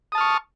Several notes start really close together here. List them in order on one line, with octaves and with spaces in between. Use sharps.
D#6 A5 F6 C#6